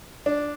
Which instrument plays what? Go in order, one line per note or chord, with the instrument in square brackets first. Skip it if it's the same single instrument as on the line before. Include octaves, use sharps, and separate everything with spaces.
[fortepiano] D4